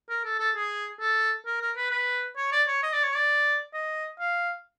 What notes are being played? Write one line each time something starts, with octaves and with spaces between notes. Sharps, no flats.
A#4
A4
A4
G#4
A4
A#4
A#4
B4
B4
C#5
D5
C#5
D#5
D5
C#5
D5
D#5
F5